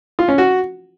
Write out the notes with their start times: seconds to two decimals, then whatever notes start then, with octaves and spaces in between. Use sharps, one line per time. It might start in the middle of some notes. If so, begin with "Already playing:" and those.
0.19 F4
0.28 C#4
0.38 F#4